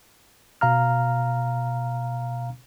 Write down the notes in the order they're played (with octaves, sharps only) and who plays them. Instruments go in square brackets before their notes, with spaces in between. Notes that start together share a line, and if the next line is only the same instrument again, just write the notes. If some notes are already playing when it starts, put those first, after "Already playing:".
[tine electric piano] B2 F5 A#5 F6